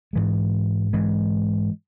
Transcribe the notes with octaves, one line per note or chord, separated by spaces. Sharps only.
G#2 E3 G#3
G#2 E3 G#3